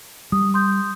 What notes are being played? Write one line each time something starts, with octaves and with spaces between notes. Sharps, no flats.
G3 D#6
C6 D#6 G6